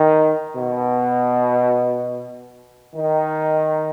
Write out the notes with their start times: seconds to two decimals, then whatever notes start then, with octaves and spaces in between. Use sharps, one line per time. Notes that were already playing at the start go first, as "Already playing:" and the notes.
Already playing: D#3
0.56 B2
2.94 D#3